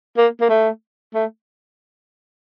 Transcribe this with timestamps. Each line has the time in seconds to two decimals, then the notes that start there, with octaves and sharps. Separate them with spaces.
0.17 A#3
0.41 A#3
0.49 A3
1.14 A3